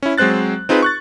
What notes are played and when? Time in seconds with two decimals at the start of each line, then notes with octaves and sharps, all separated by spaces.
0.03 C#4 E4
0.18 F#3 G#3 C4 C5 F#6 A6
0.69 C4 D#4 F4 G#4 B4
0.82 C#6 F#6 A6